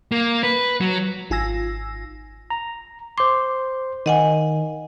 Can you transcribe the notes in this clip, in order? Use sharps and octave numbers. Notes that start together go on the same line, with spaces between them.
A#3
B4
F#3
G#1 F4 G#5 E6 A#6
A#5
C5 C6 D6
D#3 D#5 F#5 G#5